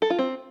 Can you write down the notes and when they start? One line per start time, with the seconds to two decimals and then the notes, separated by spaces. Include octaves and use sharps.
0.02 A4
0.10 F4
0.19 C4